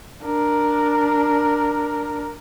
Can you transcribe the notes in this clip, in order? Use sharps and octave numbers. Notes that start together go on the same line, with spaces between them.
D4 A#4